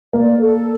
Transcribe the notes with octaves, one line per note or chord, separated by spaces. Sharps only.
A#3 D5
A4